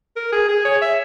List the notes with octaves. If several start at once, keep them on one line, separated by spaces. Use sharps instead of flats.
A#4
G#4
G#4
C#5
E5